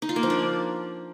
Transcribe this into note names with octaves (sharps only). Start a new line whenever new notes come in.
D#4
F4
A#3
F3
D4